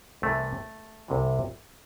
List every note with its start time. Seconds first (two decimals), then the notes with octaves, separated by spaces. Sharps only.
0.22 C2 C3 E3 A3
1.08 C2 C3 E3